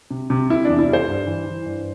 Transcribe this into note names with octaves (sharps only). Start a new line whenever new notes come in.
C3
C3
C3 E4
E2 D4
E4
G3
C5
G2
E3
E3
G2